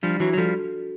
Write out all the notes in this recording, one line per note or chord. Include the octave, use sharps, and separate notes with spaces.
F3 G3 D4
E3 F#3 F#4
F#3
F3 G3 A4